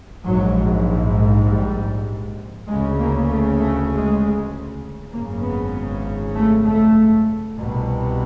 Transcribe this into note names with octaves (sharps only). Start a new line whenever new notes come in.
A#1 G#2 F#3
G3
D2 C#3 G#3
A#3
A3
A3
G#3
G#1 F#2 C#3 A#3
B3
A3
A3
C2 B2